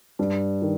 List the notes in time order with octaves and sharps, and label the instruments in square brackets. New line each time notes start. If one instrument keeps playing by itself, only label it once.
[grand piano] G2
D#3